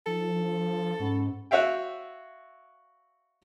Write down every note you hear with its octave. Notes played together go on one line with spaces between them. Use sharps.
F3 D#4 A4
D4
G#2 C#4 F#5 B5
F#4 C#5 E5 F5 G5